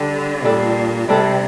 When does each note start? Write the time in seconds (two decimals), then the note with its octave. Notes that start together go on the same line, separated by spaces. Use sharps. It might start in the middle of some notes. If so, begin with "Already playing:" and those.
Already playing: D3 G3 D4 A4
0.44 A#2 G3 D4 A4
1.08 C3 G3 D4 A4